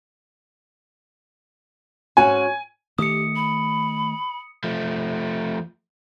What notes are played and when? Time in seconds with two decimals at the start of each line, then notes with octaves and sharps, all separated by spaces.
2.17 G#2 C#4 F#4 G#5
2.99 D#3 A3 G4 D#6 C#7
3.36 B5
4.64 F3 A3